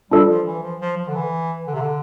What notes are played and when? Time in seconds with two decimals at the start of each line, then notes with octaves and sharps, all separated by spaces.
0.11 G3 D4 F4 A4 D5
0.29 F3
0.46 E3
0.63 F3
0.80 F3
0.97 F3
1.07 D3
1.15 E3
1.67 D3
1.74 C3
1.81 D3